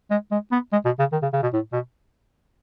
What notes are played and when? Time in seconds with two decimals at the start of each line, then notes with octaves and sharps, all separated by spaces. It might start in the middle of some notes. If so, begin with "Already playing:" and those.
0.10 G#3
0.31 G#3
0.52 B3
0.72 G#3
0.85 B2
0.99 C#3
1.12 D#3
1.22 C#3
1.33 C#3
1.43 B2
1.53 A2
1.73 B2